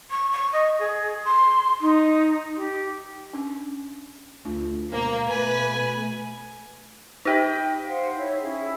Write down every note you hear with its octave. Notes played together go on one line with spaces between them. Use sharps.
C#6
C#6
D#5
G#4
C6
D#4
G4
C#4 D4
D2 A3 D4 F4
B2 G#3 A#3 A#4 C5
B2 A3 B4 G#5 A#5
D#4 G4 D#5 G5 B5
C5 F5 F#5
E4 C#5 E5
C#4 E4 G#4